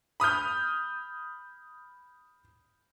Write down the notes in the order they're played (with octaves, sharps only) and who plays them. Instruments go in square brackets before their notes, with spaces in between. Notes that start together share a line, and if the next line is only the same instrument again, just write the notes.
[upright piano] B5 D#6 F6 G6